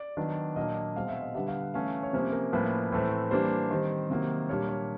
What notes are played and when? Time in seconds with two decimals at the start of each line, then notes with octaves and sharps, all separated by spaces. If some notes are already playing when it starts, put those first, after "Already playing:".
Already playing: D5
0.17 D#3 F#3 B3 D4
0.56 A#2 F#3 A#3 D4 D#5
0.96 B2 G#3 C4 F5
1.09 E5
1.22 D#5
1.35 D3 G3 B3 D4 E5
1.48 F5
1.61 F#5
1.74 E3 A3 C#4 F5
2.03 C#5
2.13 C3 F3 A#3 C#4 C5
2.33 A#4
2.53 A2 F3 A#3 C#4 B4
2.92 A2 E3 A3 C4
3.31 E3 G3 A#3 D4 C5
3.71 D#3 G3 C4
4.10 C3 D#3 F#3 A#3
4.49 A#2 G3 A#3 D4 C#5
4.69 C#5